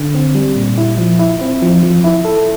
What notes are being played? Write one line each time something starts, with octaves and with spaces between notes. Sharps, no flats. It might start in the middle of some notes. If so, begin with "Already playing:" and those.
Already playing: D3
C4
G3
A#2
E4
F3
E4
C4
F3
F3
E4
A4